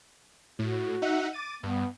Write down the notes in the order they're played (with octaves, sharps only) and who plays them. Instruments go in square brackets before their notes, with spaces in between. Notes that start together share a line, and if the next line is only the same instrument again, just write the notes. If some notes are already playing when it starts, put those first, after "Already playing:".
[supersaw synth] A2 [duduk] F#4
[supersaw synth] D#4 E5 F#5
D6 A6 D#7
[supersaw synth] G2 [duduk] B3